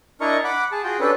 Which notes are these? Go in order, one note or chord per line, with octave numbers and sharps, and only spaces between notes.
D4 E4 A#4 D#5 A#5 C#6
F#5 B5 D6
G#4 A5
F4 F#4 G#4 G5
C#4 D4 G4 A4 B4